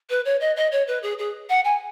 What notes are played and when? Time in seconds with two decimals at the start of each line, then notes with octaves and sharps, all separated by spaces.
0.10 B4
0.25 C#5
0.41 D#5
0.56 D#5
0.72 C#5
0.88 B4
1.03 G#4
1.19 G#4
1.50 F#5
1.64 G#5